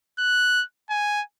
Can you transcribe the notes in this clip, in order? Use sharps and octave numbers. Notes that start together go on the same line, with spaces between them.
F#6
G#5